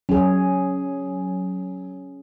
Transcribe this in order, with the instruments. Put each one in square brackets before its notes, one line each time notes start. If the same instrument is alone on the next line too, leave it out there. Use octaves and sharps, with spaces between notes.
[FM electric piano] F#3 [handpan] C#4 G#4